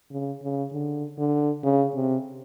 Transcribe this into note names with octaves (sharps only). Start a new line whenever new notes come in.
C#3
C#3
D3
D3
C#3
C3